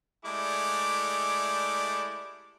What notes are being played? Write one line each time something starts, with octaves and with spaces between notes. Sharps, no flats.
G#3 A3 E4 G4 D5 D6